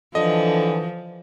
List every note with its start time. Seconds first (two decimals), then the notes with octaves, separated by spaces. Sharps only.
0.15 D3 E3 F3 D#5